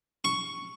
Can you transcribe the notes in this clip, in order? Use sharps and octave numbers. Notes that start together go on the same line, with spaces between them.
C#6